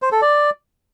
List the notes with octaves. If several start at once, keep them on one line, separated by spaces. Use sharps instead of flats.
C5
A4
D5